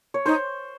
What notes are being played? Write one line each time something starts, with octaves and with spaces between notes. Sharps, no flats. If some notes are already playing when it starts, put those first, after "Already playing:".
C#5
D#4 C5